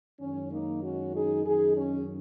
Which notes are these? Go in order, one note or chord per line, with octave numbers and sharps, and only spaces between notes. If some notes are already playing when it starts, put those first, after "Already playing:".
F#2 D#3 G#3 C#4
A#3 D#4
C#4 F#4
D#4 G#4
F#2 D#3 F#3 D#4 G#4
C#4